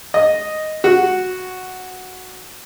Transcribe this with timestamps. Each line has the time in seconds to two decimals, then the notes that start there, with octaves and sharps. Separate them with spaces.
0.14 D#5
0.84 F#4